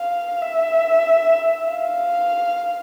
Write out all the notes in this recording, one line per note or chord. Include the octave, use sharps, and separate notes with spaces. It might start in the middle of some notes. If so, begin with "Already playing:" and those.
Already playing: F5
E5
F5